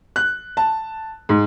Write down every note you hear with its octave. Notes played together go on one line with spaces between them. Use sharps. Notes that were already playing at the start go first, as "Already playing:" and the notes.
F#6
A5
G#2